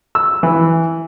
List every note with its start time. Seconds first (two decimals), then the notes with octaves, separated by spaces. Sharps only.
0.15 E6
0.43 E3